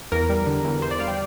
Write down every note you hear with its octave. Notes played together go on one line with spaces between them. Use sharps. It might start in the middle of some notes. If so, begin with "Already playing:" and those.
E2 A#4
G3
D3
E2
E2 C5
D5
G3 F5
G5